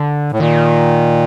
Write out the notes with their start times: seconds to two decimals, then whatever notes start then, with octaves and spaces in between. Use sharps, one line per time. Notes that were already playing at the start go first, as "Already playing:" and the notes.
Already playing: D3
0.32 A2
0.39 A#2 D#3